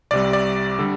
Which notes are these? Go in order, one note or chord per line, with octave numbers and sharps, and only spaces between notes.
C2 C3 G3 D5
D5
D3 G3